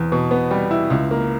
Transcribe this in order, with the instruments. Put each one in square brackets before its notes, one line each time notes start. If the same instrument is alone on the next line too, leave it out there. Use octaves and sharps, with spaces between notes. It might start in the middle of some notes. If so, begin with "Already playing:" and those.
Already playing: [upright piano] E2
B2
B3
G3
E4
C#2
A#3